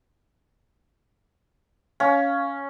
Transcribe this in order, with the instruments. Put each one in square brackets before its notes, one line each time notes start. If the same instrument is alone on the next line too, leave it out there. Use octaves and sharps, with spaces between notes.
[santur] C#4 [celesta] F5